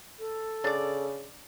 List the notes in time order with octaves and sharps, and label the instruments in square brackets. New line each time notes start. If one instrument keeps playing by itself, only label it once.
[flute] A4
[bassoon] C#3 [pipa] D4 D5